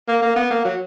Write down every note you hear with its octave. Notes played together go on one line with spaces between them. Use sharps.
A#3
A#3
B3
A#3
F#3